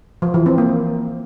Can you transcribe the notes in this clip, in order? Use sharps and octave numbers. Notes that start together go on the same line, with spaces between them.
F3
E3
C4
A#3